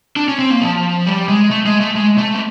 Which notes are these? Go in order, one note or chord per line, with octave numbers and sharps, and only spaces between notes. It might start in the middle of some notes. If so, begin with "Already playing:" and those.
D4
C#4
C4
A#3
F3
G3
G#3
A3
G#3
A3
G#3
A3
B3